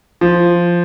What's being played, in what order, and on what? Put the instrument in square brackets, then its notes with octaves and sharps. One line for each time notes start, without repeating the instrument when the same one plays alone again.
[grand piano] F3